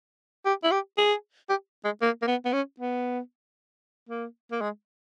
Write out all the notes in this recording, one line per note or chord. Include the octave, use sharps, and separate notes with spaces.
G4
E4
G4
G#4
G4
G#3
A#3
A#3
B3
B3
C#4
B3
A#3
A#3
G#3